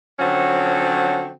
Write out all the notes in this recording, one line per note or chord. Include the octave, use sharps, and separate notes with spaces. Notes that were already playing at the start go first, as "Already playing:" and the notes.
D3 F3 F#3 C4 C#4 F#4